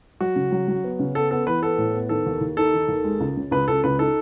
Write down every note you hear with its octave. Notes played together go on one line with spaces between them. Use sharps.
F#3 F#4
C#3
F#3
F#3
B3
C#3
B3 A4
B3 A4
E3 B4
B3 A4
A2
B3
D#3 A4
D#2
D#2
D#4 A4
D#3
D#2
G#3
C#2
C#3
C#2 B4
C#2 A4
C#2 B4
D#4 A4